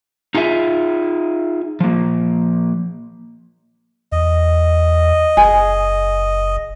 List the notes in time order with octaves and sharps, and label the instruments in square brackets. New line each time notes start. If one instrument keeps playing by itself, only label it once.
[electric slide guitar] D#4 F4 G#4 C#5 E5
F3 A#3
[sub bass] E2 [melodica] D#5
[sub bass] F#1 [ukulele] G#4